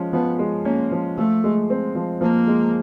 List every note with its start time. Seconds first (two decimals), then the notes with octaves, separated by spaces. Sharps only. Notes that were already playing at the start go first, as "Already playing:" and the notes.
Already playing: F3 G#3 C#4
0.13 F3 B3
0.39 G#3
0.65 A#3 C#4
0.92 F3
1.17 F3 A3
1.44 G#3
1.70 C4
1.95 F3
2.21 F3 A#3
2.48 G#3